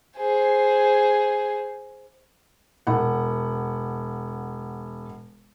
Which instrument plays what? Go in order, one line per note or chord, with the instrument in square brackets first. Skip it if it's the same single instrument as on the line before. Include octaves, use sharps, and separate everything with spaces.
[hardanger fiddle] G#4 C5
[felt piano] E1 F#5